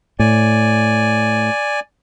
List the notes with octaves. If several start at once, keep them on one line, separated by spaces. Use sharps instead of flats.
A2 D5 G#5